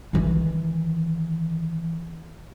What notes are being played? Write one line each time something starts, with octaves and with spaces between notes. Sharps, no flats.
D#3 E3